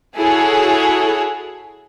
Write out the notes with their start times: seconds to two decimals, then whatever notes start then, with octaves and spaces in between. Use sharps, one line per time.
0.18 E4 F#4 G#4 A4 C#5